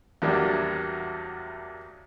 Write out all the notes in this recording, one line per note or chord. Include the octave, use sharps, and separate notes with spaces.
E2 A2 F#3 G3 A#3 D4